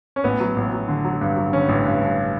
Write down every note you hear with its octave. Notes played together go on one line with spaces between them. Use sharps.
C#4
A1 B3
F#3
A1
F#3
D3
F#3
G2
F#3
D3 C#4
A1
G2
G2